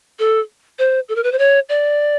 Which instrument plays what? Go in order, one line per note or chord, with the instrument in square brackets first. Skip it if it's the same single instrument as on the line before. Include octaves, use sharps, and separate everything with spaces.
[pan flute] A4
C5
A4
A#4
B4
C5
C#5
D5